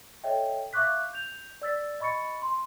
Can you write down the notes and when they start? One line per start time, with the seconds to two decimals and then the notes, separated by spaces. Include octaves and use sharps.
0.24 A4 C#5 D#5 E5 G5
0.73 E5 F5 C#6 D6 F#6 B6
1.13 G6 F7
1.62 D5 E6 A6 B6
2.00 D#5 B5 C#6 A6 C#7
2.42 C6